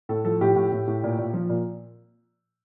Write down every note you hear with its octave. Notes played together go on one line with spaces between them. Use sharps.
A2 A4
F3 A4
A2 G4
A2
A2
A2
A#2
A#2
F3
A#2